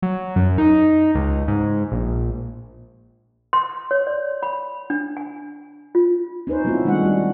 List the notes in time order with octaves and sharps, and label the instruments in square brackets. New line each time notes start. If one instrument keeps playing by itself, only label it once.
[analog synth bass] F#3
F#2
D#4
C#2
G#2
A#1
[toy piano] C6
C#5
D5
B5
D4
G#5
F4
[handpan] C#4 D#4 B4 C5
F#3 A3 B3 C4 E4 F4
D#3 G3 G#3 C#4 D4 F#5
G3 F#4